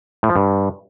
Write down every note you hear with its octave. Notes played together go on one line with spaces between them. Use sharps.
A2
F3
G2